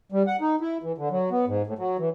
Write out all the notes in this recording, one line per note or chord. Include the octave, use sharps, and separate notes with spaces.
G3
F#5
D#4
E4
E3
D3
F#3
B3
G#2
A2
F#3
E3